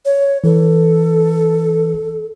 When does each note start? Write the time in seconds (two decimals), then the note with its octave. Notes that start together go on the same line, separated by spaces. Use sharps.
0.05 C#5
0.44 E3 A4 B4